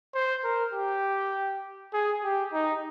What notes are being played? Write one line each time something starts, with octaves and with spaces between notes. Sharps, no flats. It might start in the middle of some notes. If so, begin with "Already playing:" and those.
C5
A#4
G4
G#4
G4
D#4